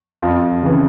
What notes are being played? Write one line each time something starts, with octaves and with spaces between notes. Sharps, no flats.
F2 F4
C#3 E3